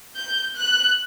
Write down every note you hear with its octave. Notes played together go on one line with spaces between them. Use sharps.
G6
F#6